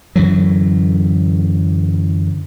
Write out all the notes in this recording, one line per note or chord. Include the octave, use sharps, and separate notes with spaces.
F#2 D3 E3 F#3